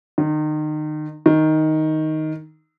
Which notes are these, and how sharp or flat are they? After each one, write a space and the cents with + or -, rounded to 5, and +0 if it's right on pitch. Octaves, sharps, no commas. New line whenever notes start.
D#3 -30
D#3 +5